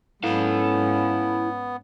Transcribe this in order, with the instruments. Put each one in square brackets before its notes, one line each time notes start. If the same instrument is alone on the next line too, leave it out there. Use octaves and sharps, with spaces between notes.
[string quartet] G#2 C#4 [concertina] B3 [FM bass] E4 [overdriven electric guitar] A4 F5